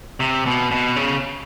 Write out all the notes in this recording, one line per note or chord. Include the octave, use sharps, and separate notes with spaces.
C3
B2
B2
C#3